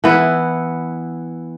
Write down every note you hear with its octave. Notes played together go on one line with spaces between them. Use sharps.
E3 B3 E4